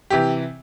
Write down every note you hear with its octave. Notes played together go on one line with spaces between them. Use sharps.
C3 E3 G4